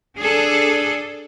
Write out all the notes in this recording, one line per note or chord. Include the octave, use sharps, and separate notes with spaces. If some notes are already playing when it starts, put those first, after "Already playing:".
D4 G#4 A4